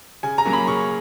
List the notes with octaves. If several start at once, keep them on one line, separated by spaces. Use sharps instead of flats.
C#3 G#5
A#5
F#3 A#3 C#4
B5
C#3 C#6